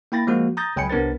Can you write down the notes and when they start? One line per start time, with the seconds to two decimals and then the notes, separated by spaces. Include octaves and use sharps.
0.12 A#3 E4 G5 B5 A6 A#6
0.27 F3 G#3 A#3 F#4
0.57 A#5 D#6 G6 A6 A#6
0.76 C#2 F#3 G5 G#5 B5 C#7
0.90 C2 B3 D4 A#4 B4 A6